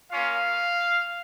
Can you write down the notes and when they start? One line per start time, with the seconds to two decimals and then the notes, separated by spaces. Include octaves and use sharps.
0.10 A#3 C#4 F4 F5